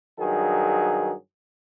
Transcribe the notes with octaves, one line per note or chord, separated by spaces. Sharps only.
G2 D#3 F#3 G#4